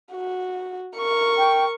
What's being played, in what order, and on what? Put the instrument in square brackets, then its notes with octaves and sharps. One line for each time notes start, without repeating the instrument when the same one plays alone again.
[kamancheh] F#4
A#4 C#6
[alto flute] G5